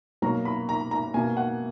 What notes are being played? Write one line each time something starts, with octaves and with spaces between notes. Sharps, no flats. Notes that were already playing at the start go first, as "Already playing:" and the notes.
B2 F#3 A#3 A#5
B5
A#5
A#5
B2 A#3 G#5
F#5